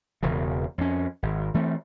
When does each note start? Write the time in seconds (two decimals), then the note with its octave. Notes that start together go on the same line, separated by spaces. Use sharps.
0.23 E1 E2 C#3
0.78 F2 C#4
1.23 G#1
1.54 E3 A3 C4